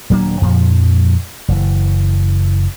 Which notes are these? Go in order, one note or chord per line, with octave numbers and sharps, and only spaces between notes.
D#1 F#3 A#3 D4
F2 A#2 F3
F#1 E3